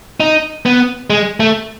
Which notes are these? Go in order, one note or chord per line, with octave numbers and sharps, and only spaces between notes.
D#4
B3
G#3
A3